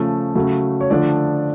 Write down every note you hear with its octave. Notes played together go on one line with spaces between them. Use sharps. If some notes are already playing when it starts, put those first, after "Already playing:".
Already playing: C#3 F3 A3 C#4
C#3 F#3 A3
C#5
D3 F3 A3 D4 D5